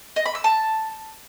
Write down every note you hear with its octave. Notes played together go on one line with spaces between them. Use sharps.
D#5
B5
E6
A5